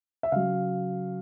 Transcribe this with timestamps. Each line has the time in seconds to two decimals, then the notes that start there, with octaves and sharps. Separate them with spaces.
0.23 E5
0.32 C#3 F#3 F5